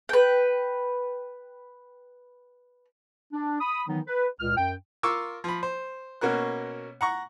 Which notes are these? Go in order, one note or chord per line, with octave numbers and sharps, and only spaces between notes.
B4 G5
D4
B5 D#6
D#3 E3 F#3 B3 D#4
B4
C#2 A#2 F6
F#2 G5
F4 A#4 C#6 D6 E6
F3 B5
C5
B2 A#3 C#4 F#4 A#4 F#6
F#5 A#5 C#6